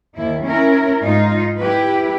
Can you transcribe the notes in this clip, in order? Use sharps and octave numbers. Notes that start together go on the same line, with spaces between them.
D#2 E4
C#4 E4 A#4
G#2 D#4 F4
E4 G4 B4